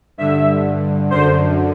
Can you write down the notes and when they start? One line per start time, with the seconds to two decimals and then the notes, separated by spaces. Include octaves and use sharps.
0.18 G2 D3 E5
1.10 F#2 D3 C5